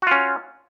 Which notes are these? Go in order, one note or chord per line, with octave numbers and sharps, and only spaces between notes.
C#4 F4 F#4